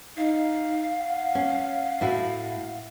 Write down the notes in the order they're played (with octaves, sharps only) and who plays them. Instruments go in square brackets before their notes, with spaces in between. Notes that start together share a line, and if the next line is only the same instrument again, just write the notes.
[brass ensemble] D#4 [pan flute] F5
[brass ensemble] F#5
[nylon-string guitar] C#4
A2 E4 F#4